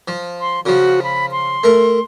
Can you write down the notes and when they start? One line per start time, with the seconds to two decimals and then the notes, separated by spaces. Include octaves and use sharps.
0.08 F3
0.40 C6
0.66 C#3 F3 F#4
1.03 B5
1.32 C6
1.64 A3 A#4